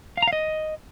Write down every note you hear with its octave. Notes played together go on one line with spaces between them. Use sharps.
F5
A#5
F5
D#5